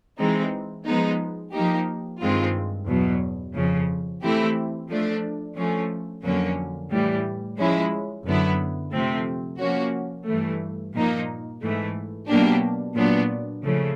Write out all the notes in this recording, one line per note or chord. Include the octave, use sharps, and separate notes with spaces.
E3 G#3 C4 D#4
F3 G#3 B3 D#4
F3 A#3 D#4 G4
G2 D#3 G#3 C4 F4
E2 B2 F#3
F2 C#3 F3
E3 A3 C4 E4 G4
F3 A3 D4
F3 A3 C#4
F2 D3 F#3 A#3 C#4
A2 E3 G3
F3 G#3 C#4 E4
F#2 D3 F#3 B3 E4
C3 F3 A3 C4
F3 A#3 C#4 F#4
G2 E3 A3
A#2 F3 A#3 D#4
G#2 E3 A3
B2 F#3 A#3 D4 G4
A#2 F#3 B3 D4
C#3 F3 A3